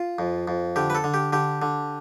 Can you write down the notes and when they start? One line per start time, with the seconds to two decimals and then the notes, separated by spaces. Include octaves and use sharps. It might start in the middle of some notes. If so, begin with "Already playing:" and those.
Already playing: F4
0.19 F2
0.48 F2
0.76 D3 G4
0.90 B4
0.95 A4
1.04 D3
1.14 G4
1.33 D3 G4
1.62 D3